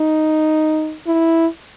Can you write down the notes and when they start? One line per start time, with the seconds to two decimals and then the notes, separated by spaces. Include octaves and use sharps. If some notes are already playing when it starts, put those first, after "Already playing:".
Already playing: D#4
1.07 E4